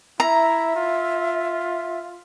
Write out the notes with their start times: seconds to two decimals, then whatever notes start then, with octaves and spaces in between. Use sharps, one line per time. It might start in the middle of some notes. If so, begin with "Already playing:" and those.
0.20 E4 E5 A#5
0.76 F4